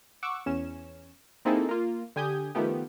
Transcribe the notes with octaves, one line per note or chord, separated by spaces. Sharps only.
F#5 C#6 D6 E6
E2 C#4 E7
A#3 C4 D#4 E4 G#4 A4
A#3 F4
D3 G4 G#5 D#6 G6
D#3 F3 A3 B3 G4